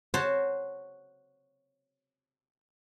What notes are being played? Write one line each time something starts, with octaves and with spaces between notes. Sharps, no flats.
F#4 C5 C#5 A5